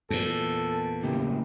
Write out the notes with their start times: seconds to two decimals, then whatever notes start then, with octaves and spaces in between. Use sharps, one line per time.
0.10 E2 A#2 A4
1.03 A2 C#3 A#3 G4